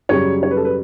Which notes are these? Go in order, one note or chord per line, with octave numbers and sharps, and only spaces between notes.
F#2 C#3 G3 C#5
C#5
B4
A4
B4